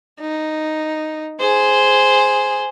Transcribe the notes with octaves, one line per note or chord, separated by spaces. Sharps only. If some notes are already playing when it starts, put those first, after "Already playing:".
D#4
G#4 C5